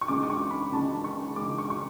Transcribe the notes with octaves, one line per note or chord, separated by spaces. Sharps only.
C#6
C#2 C#3 G#3 D4 D6
D6
C#6
B5
C#2 C#3 G#3 D4 A5
C#6
C#2 C#3 G#3 D4 D6
C#6
C#6